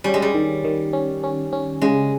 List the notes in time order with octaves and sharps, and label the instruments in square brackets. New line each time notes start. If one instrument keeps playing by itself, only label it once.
[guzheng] G3 [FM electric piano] C#4
[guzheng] G#3
G3
[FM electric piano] D#3
D#3
C#4
C#4
C#4
[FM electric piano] C#3 [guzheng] G#3